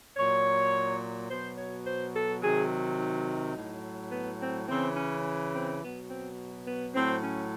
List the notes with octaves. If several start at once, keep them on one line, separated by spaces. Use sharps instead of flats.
A#2 F#3 C#5
B2 F#3 C5
C#5
C5
A4
C3 D#3 F#3 G#4
D#4
A2 F#3
B3
C4
C#3 E3 C4
C#4
C4
B2 F#3 B3
C4
B3
A2 F#3 C4
C#4